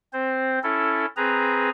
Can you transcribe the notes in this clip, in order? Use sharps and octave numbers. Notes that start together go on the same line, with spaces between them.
C4 C5
C#4 E4 A4
C4 G#4 B4 A#5